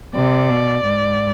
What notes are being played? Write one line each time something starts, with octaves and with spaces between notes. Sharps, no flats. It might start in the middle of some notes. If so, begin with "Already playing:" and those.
C3 D5
B2
G#2